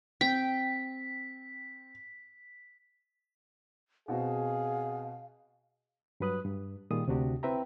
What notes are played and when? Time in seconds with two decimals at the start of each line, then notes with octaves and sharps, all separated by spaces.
0.21 C4 G5 B6
4.08 B2 C4 F#4 G#4 F5
6.20 G2 F#3 B4 D#6 F#6
6.45 G2
6.91 A#2 D#3 G3 F4 G#4 D#6
7.08 D2 C3 D4 F#4 G4
7.43 C4 E4 B4 E5 G5 A#5